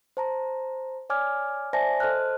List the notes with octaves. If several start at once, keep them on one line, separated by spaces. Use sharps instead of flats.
C5 A5 A#5
C#5 D5 G#5 D6 F6 G#6
C5 D5 E5 G#5 A5 A#6
A4 C5 D#5 A5 F6 F#6